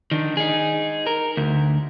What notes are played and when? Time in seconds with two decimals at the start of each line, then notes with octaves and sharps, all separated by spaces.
0.11 D#3 D4
0.37 D#4 G#4
1.07 A#4
1.37 D2